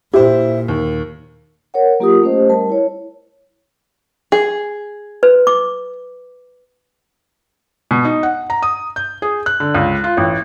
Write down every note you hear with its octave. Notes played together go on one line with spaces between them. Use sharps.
A#2 E4 G4 C5
D#2
A#4 C#5 F#5
F#3 A#3 F4 G4 A#4 D#6
A3 C#4 G4 C5 D#5
G3 A#4 A5
E4 C#5
G#4
B4
D6
B2
D#4
F#5
A#5
D#6
G6
G#4
F#6
D3
C#2
F4
A1